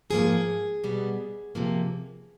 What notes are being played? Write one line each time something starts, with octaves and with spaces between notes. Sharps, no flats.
G#2 F3 A#3 G#4
B2 G3 B3
C3 F3 A#3